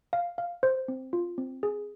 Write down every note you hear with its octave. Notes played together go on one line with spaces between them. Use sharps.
F5
F5
C5
C4
F4
C4
G#4